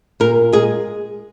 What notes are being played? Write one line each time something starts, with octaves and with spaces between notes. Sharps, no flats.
A#2 A#4
G#3 G#4